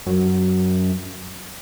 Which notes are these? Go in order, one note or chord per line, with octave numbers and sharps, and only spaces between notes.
F#2